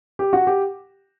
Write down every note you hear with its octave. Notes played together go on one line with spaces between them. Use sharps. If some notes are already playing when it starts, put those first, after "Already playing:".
G4
F#4
G4